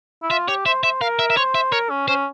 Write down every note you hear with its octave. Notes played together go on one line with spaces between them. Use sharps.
E4
F4 E5
G4 C#5
C5 E5
C5 E5
A#4 F5
E5
E5
C5 C#5
E5
A#4 C#5
C#4
C#4 C5